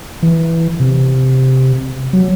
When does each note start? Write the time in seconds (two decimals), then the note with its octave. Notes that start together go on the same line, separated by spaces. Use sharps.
0.22 E3
0.80 C3
2.13 F#3